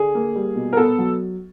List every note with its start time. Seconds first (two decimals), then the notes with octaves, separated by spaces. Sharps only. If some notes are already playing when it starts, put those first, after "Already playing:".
Already playing: D3 G#4
0.15 A#3
0.36 G3
0.56 B2
0.73 A#4
0.77 B3 A4
0.98 F#3